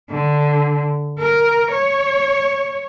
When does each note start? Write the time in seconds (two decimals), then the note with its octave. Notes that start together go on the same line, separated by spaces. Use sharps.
0.10 D3
1.18 A#4
1.71 C#5